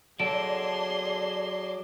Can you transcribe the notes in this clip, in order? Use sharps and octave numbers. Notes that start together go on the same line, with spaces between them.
F#3 G#4 A4 D5 C6 D7